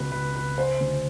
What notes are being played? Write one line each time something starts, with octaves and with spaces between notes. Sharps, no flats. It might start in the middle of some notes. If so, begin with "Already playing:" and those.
Already playing: C#2 B2 G#3 B4
C#2 B4
C#2 B4
G#3 C5
D2